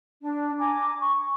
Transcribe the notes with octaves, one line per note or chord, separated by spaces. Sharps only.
D4
G#5 A#5 D6
C#6